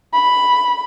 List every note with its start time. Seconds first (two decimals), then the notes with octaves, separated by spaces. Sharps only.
0.14 B5